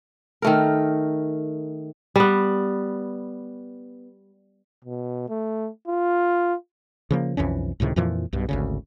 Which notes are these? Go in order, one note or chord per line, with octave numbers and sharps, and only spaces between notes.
D#3 A3 A#4
G3 B3
B2
A3
F4
C#3 F3 A#3
B1 F2 E3 C#4
C#2 A2 C3 D#3
F2 A#2 E3 F3
B1 G2 B2
G#1 D2 C#3